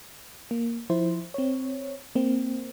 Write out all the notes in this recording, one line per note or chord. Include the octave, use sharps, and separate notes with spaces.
A#3
F3 E4 C5
C4 C#5
A#3 C4